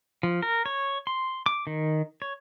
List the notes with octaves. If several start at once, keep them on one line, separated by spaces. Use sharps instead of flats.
F3
A#4
C#5
C6
D6
D#3
C#5